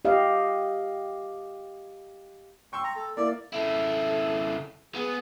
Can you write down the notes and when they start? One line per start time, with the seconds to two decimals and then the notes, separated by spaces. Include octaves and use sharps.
0.05 G4 D#5 F5
2.73 G5 C6 C#6 E6
2.84 A#5
2.96 A4
3.17 A#3 E4 D5
3.53 C#3 E4 A4
4.95 B3 G#4